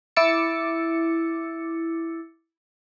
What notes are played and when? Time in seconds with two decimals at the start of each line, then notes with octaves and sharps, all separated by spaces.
0.16 E4 D6 E6 A6 C#7